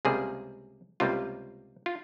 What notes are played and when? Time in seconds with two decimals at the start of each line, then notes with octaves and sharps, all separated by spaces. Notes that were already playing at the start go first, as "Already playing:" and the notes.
0.05 C#2 C3 G3 A#3 G#4
1.00 C#2 C3 G3 A#3 F4
1.86 F4